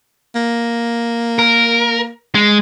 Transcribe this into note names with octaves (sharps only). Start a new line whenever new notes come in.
A#3
A#4
G#3